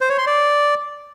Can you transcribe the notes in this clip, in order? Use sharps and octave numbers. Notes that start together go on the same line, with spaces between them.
C5
C#5
C6
D5